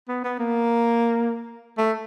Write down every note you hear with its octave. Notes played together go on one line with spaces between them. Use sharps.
B3
B3
A#3
A3